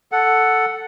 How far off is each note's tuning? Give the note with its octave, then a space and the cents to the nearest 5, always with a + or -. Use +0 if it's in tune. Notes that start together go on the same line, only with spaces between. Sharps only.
A4 +0 F#5 +0